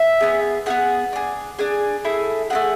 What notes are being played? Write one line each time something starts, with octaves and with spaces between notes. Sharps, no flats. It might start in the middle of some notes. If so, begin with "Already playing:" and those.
Already playing: E5
B3 E4 G#4
B3 E4 G#4 F#5
D4 G#4
D4 G#4 G#5
A3 E4 G#4
A3 E4 G#4 F#5